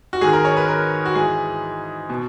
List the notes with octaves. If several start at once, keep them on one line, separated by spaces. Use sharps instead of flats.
F#4
G#2 D#3 G#4
A#4
C#5
B4
A#4
F#4
G#2 E3 G#4
B2